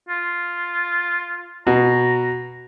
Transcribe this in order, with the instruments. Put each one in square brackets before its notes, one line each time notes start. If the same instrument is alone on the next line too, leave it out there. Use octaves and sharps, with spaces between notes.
[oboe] F4
[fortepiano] B2 [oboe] A#5